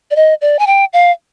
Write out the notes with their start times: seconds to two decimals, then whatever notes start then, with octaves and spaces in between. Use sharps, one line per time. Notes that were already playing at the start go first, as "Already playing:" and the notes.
0.11 D5
0.16 D#5
0.41 D5
0.59 G#5
0.67 G5
0.93 F5